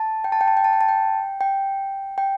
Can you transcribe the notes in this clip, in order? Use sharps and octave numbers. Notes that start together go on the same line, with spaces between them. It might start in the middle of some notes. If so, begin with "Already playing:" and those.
Already playing: A5
G5
A5
G5
A5
G5
A5
G5
A5
G5
G5
G5